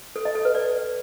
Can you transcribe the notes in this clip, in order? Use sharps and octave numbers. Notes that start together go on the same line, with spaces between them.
A4
D#5
A4
B4
D5